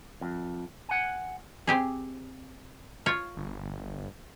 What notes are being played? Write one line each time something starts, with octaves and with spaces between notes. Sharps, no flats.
F2
F#5 G#5
C4 G4 G#4
F4 C#5
G1